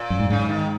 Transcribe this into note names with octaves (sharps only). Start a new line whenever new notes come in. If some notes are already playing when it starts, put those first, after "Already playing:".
Already playing: A#2
F#2
G#2
G#2 C#3
D#3